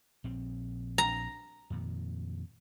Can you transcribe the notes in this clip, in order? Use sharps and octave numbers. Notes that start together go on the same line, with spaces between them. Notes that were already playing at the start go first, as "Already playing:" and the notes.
A#1 C4
A#5
F2 A#2 D#3